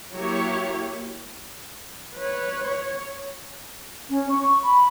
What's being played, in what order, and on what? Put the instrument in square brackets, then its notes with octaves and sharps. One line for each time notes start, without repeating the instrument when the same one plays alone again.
[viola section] F#3 A#3 E4 G4 C#5
[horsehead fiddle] B4 C#5
C#5
[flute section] C#4
C#6
B5